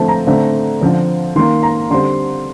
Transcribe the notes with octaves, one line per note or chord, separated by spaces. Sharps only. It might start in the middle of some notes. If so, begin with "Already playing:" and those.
Already playing: D3 F3 A3 C4 A5
A#5
D3 A3 C4
D3 F3 C4
D#3 A#3 C6
A#5
D3 G3 C4 C6